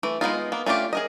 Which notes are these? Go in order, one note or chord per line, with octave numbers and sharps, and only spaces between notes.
E3 A3
G#3 B3 D#4 F4
A#3 B3
A3 C#4 D4 F4 G4
G#4 A#4 D#5